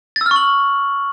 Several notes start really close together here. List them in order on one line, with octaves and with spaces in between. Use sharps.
A6 E6 F6 C#6 F#7